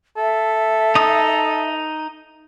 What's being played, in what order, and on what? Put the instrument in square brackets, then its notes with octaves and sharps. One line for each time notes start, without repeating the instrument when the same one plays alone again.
[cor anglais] A4 [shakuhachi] E5
[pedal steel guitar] D#4 D#6